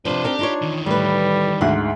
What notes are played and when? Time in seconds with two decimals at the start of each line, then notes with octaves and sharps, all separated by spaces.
0.05 C3 F3 D4 B4 C5
0.24 C4 D#4 G4 A#4
0.39 D#4 F4 C#5
0.62 E2 D#3
0.86 A2 G3 B4
1.61 D2 G#2 F#5